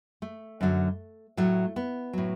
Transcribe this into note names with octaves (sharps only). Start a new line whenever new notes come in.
A3
F#2 D3 F#3
A2 F#3 A3
B3
A2 F#3